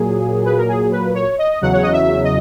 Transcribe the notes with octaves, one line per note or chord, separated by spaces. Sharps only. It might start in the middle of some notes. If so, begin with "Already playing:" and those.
Already playing: A#2 F#3 A#3 G#4
B4
A#4
G#4
B4
C#5
D#5
E2 C#3 F#3 F#5
C#5
D#5
E5
D#5